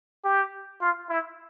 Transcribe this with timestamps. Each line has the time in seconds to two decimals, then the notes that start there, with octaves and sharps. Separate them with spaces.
0.25 G4
0.81 F4
1.10 E4